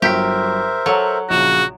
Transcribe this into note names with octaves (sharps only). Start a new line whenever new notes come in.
G1 F#3 G4 A#4 C5 E5 B6
F#3 A4
A#1 C#3 F#4 E7